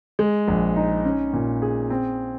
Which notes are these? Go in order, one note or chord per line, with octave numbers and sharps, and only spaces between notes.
G#3
A#1
D#4
C#4
A#2
G#4
C4